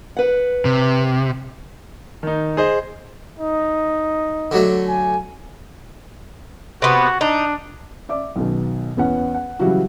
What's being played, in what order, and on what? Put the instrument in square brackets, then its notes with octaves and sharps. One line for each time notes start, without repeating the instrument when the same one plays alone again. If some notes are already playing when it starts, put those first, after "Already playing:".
[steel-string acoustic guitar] B4 F#5
[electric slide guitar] C3
[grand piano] D#3 D#4
G#4 C5 D#5
[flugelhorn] D#4
[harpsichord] D3 F#3 A3
[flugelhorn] G#5
[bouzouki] C3 B3 [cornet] F#4
[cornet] D4 [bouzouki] D#4
[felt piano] D5 E5 D6
B1 B2 D#3
E2 B3 C#4 F#5
F#5
C#3 E3 F#3 G3 E4 F#4